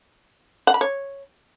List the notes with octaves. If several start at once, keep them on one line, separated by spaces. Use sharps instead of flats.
F#5
B5
C#5